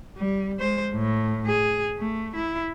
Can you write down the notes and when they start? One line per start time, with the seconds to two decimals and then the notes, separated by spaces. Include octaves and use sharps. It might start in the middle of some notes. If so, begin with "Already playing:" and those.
0.17 G3
0.60 G#3 C5
0.94 A2
1.47 G#4
1.98 A3
2.35 E4